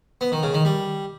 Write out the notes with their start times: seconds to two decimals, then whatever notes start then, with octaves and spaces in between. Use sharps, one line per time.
0.21 B3
0.32 D#3
0.43 C#3
0.54 D#3
0.65 G3